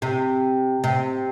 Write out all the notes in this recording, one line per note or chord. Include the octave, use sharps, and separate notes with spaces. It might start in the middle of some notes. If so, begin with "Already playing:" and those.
C3
C3